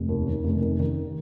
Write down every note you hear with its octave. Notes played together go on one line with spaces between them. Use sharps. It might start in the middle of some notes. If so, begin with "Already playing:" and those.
Already playing: F1
D#2
D#3
F1
D#3
D#3